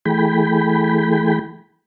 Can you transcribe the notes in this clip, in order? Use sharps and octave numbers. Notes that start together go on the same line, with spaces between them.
E3 A3 G#4 G5 B5